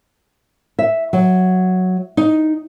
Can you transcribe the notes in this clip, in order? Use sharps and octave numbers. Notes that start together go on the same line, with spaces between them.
E5
F#3
D#4